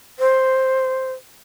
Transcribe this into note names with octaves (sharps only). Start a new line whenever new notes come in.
C5